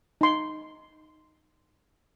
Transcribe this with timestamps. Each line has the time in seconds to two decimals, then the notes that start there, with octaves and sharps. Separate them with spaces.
0.21 D#4 C6